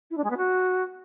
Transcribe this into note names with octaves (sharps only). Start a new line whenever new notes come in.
E4
D4
G#3
B3
F#4